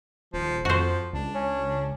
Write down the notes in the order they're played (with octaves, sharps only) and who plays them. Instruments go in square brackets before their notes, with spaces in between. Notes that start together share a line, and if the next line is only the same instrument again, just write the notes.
[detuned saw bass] D#1 [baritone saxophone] F3
[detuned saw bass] F2 [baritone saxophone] F3 [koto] F#4 C5
[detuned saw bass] C#2 [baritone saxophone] D4
[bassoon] C#4